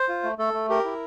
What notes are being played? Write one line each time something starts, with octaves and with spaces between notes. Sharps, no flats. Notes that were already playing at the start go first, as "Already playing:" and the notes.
Already playing: C5
F4
A3
A3 A4
A3
G4 A#4
E4